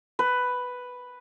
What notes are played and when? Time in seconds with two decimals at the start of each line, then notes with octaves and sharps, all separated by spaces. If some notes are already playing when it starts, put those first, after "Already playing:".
0.19 B4